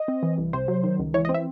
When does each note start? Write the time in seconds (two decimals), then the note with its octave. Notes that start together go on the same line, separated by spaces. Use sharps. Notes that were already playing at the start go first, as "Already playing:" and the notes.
Already playing: D#5
0.08 C4
0.23 E3
0.38 C2
0.53 C3 C5
0.68 F#3
0.83 D#3
0.99 C#2
1.14 E3 C#5
1.25 D#5
1.29 C4
1.34 E5